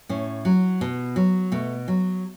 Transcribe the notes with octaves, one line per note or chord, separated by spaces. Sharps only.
A2 C#4
F#3
B2
F#3
B2 A3
F#3